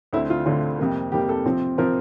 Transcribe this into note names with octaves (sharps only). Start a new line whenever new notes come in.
D2 D3 A3 C4 E4
F4
D2 D3 A3 C4 F4
F2 C3 G3 A#3
F2 C3 G3 A#3 G4
A4
C3 F3 C4
C3 F3 C4 A#4